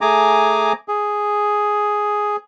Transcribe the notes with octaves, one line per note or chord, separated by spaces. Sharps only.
A3 G#4 G#5 A#5 D6
G#4